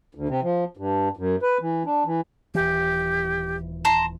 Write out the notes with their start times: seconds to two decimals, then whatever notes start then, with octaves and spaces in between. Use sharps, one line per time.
0.15 D2
0.29 C3
0.42 F3
0.77 G2
1.17 F#2
1.42 B4
1.61 E3
1.86 D4
2.06 E3
2.55 D#1 E3 G4
3.85 A5 A#5 C6